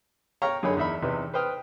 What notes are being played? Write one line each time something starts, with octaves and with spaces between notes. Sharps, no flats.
C#5 F5 G5 A#5 C#6
F#2 D3 D#4 G#4 C#5 B5
E2 D#4 E5 B5
E2 C3 D#4 B4
B4 C5 G5 D#6 F6